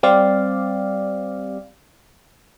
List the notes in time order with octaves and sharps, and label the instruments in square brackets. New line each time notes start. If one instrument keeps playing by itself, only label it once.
[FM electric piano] G3 C4 G4 D5 F5